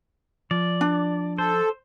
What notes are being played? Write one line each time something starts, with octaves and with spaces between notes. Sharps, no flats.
F3 D5
D4
A4 C5